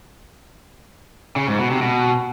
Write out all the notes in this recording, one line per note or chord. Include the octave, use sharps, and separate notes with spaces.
C#3
G#2
B2
C3
B2